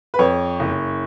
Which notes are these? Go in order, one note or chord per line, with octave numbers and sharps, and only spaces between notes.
B4
F2 C#5
F#1